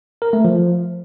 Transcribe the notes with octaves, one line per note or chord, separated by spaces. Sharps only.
A#4
A3
F3